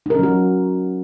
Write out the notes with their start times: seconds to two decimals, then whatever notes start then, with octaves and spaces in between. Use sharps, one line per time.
0.06 D#4
0.10 A#4
0.15 C#4
0.19 F#3
0.23 F#4